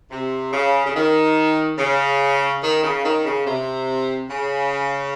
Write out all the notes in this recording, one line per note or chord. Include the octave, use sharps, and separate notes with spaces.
C3
C#3
C#3
D#3
C#3
D#3
C#3
D#3
C#3
C3
C#3